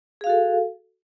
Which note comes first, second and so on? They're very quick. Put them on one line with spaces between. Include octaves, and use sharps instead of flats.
G#4 F5 F#4 A4